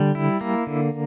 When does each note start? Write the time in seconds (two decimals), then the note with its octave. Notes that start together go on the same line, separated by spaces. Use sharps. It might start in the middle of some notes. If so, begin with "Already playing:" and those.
Already playing: D3 G3
0.15 E4
0.41 A#3
0.67 D3